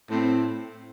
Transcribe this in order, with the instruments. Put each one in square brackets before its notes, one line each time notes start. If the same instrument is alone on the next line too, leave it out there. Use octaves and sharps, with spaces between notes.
[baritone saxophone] A2 [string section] C4